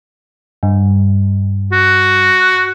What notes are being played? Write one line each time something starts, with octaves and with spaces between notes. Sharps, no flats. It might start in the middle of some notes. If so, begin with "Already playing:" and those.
G2
F#4